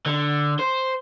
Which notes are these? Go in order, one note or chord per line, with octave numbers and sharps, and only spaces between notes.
D3
C5